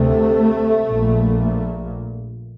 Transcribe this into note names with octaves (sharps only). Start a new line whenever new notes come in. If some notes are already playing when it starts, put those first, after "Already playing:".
Already playing: D2 C3 A3
A#1 A#2